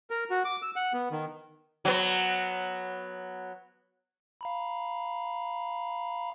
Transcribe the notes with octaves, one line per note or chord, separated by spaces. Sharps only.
A#4
F#4
D6
E6
F#5
B3
D#3
F#3 B3
F5 A#5 B5